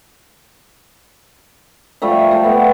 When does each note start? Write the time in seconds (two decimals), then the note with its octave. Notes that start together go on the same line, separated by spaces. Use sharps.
2.02 F3 G3 A3 E5
2.31 A3 G4
2.44 A3 B3